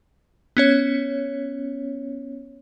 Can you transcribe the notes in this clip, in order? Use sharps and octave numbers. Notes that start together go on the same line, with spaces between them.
B3 C#4 C#5